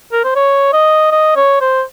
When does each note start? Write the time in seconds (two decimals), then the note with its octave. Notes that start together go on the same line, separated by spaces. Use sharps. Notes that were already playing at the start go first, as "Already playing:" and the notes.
0.12 A#4
0.24 C5
0.35 C#5
0.73 D#5
1.12 D#5
1.36 C#5
1.61 C5